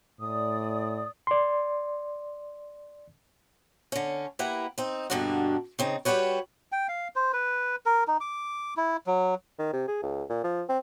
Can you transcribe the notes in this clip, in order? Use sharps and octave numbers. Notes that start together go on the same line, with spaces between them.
A2 D5 D#6
D5 C6
D3 C#4
A#3 E4 G4 B4 F#5
C4 D#4
G2 B2 D3 A#3 D4 F#4
C#3 C4 D#4
G3 F#4 G4 B4 C#5
G5
F5
C5
B4
A#4
D#4
D6
E4
F#3
D#3
C3
G#4
C#2
A#2
F3
C4